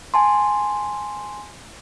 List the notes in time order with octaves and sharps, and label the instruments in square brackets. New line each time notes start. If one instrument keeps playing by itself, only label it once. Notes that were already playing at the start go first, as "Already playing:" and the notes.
[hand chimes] G#5 A5 C6